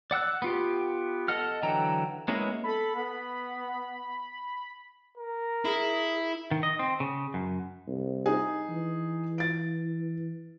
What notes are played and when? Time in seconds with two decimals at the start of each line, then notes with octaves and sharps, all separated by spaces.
0.11 D5 F#5 E6 F#6
0.42 B3 F4 G4
1.28 A4 D#5 F#5 F6
1.63 D3 E3 F#3 G5 A#5
2.28 G#3 A#3 B3 C#4 E4
2.64 A4 B5
2.95 B3
5.17 A#4
5.65 E4 G#4
6.51 D#3
6.63 D#5
6.79 C4
7.00 C#3
7.34 F#2
7.87 C2
8.26 D#4 G#4
8.70 E3
9.38 A6 D7